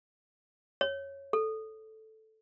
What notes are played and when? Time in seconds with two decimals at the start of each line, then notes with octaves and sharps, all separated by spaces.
0.81 C#5
1.33 A4